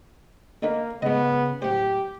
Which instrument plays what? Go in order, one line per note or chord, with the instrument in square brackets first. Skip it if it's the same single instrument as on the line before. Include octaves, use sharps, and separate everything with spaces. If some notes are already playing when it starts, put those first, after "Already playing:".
[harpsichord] D3 D#4 B4 [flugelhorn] A#3
[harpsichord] G#2 D#5 [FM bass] C#3 [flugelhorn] B3
[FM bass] D1 [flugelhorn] G4 [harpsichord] C5 F#5